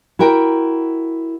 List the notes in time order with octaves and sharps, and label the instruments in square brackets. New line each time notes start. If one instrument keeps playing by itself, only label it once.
[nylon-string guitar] E4 F#4 A#4 G5